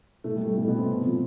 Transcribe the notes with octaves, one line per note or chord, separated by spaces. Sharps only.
B2 A3
G3
A3
B2 A3
B2 B3
C3 C4
C3
F3